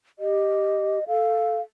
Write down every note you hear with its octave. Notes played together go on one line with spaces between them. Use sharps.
G4 D#5
A4 F5